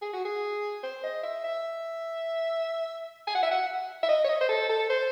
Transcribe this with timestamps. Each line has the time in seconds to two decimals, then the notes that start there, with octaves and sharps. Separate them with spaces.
0.02 G#4
0.13 F#4
0.25 G#4
0.83 C5
1.04 D#5
1.24 E5
1.44 E5
3.27 G#5
3.35 F#5
3.43 E5
3.51 F#5
4.03 E5
4.08 D#5
4.24 C#5
4.29 D#5
4.41 C5
4.49 A4
4.69 A4
4.90 C5